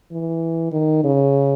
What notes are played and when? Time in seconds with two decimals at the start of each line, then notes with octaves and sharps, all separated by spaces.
0.12 E3
0.72 D#3
1.04 C#3